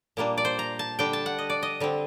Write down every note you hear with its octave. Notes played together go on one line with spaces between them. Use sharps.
A#2 G3 A#3 D4
D5
C5
A#5
A5
D3 G3 D4 G5
A5
F#5
D#5
D5
D#5
D3 G3 C4